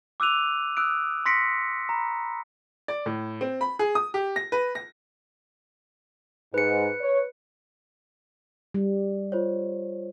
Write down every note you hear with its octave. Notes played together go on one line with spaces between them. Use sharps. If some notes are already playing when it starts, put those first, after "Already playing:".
D6 E6 F#6 D#7 F7
D#6 E6 F#6 D7
C6 A#6 B6 C#7 D7
A#5 B5
D5
A2
C4
B5
G#4
D#6
G4
A#6
B4
A#6
G#2 B4 C#7
C#5
G3
F4 C5 C#5